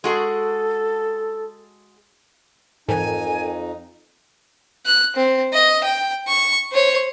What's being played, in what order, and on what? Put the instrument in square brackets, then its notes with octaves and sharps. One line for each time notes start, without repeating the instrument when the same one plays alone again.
[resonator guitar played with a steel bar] G#3 F#4 G#4 [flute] A4
[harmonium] F2 D#4 [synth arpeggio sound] G#2 E3 [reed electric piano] A4 A#4 G5 [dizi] G#5
[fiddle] F#6
C4
D#5
G5
C#6
C5 C#5